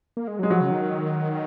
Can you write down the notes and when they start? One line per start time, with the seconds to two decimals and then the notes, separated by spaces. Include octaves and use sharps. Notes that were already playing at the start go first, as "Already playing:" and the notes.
0.17 A#3
0.28 G#3
0.39 F#3 G#3
0.50 F3 F#3
0.61 C#3
0.71 D#3